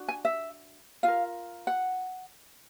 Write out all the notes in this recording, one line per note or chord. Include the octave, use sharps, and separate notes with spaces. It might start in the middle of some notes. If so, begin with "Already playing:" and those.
Already playing: D4 F#4
G#5
E5
F4 A#4 F5
F#5